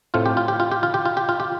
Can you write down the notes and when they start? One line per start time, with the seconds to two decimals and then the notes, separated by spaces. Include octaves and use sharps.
0.14 A2 A3 C4 F4
0.26 G4
0.37 F4
0.48 G4
0.60 F4
0.71 G4
0.83 F4
0.94 G4
1.05 F4
1.17 G4
1.29 F4
1.40 G4